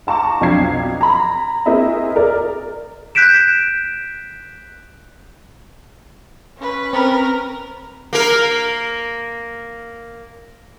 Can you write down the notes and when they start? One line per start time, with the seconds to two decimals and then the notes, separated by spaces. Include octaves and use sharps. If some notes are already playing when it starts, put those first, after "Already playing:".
0.07 F5 A5 A#5 C#6 D6
0.41 B1 F2 D4 F5 G#6 C7
1.01 A#5 B5
1.66 A#3 C4 E4 G#4 D#5 E5
2.15 G#4 A#4 D5
3.15 F#6 G6 B6 D7 E7
6.58 C#4 B4
6.93 C4 A#4
8.13 A#3 A#4